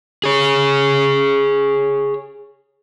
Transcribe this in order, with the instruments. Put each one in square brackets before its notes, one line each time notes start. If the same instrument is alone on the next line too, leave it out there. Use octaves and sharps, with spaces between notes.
[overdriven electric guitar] G#4 C#5